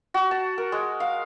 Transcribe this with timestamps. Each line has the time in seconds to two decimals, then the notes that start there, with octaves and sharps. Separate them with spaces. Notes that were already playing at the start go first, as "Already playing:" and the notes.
0.14 F#4
0.31 A5
0.58 A#4
0.72 G#3
1.00 F5